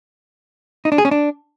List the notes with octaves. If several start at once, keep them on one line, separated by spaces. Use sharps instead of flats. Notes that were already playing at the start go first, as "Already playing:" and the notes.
D#4
D4
G#4
C#4
D4